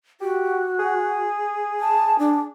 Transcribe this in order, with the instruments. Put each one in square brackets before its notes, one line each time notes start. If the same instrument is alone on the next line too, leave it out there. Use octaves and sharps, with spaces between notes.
[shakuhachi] F#4 [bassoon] G4
[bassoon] G#4
[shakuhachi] A5
D4